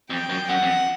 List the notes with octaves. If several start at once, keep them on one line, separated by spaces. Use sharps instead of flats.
F2 G5
F#2
F#2 F#5
F2